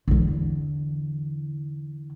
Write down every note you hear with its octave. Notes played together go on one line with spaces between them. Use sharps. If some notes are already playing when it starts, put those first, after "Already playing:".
E2 D3